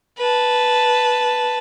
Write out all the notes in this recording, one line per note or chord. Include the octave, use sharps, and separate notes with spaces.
B4 A5